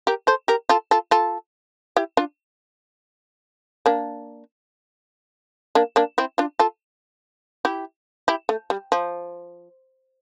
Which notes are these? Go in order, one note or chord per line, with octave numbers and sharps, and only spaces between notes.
G4 A#4
A4 C5
G4 A#4
F4 A4
F4 A4
F4 A4
E4 G4
D4 F4
A#3 D4
A#3 D4
A#3 D4
C4 E4
D4 F4
F4 A4
E4 G4
E4 G4
A3
G3
F3